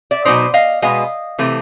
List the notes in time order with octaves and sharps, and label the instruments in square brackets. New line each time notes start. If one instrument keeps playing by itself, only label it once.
[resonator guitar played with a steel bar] D5 E5
B2 F#3 A3 C4 D#4 C5 D5
D#5 F5
B2 G#3 B3 D#5 F5
C3 E3 A3